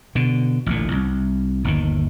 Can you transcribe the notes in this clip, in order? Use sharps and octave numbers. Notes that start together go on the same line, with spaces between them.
B2 D3
A1 D2 A#2
C2
G1 D#2 D#3